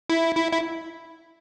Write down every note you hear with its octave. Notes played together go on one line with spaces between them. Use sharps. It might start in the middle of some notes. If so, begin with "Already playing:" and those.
E4
E4
E4